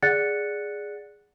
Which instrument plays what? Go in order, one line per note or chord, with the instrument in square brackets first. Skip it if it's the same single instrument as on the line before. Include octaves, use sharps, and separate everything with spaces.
[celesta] G#4 D5 F#5 F#6 A6 C#7